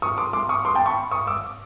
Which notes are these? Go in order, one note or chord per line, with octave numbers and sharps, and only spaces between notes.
C#6 D#6
C6 D6
C6 D6
C#6 D#6
C6 D6
G5 A5
B5 C#6
C#6 D#6
D6 E6